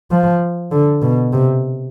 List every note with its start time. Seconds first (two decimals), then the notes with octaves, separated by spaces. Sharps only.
0.11 F3
0.71 D3
1.02 B2
1.33 C3